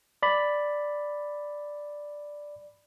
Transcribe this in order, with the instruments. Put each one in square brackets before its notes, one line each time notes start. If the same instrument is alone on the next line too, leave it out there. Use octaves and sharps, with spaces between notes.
[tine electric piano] D5 B5